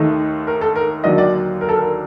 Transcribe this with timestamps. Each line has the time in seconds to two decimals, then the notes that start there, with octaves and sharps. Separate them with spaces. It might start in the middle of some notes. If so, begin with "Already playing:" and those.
Already playing: D#2 D#3 A3 D#4
0.47 A#4
0.61 A4
0.75 A#4
1.04 D#2 D3 F#3 A#3 D4 D#5
1.18 D5
1.61 A#4
1.69 A4
1.76 A#4